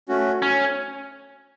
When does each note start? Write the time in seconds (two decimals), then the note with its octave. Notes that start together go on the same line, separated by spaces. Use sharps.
0.09 A3 C#4 F#4
0.42 C#4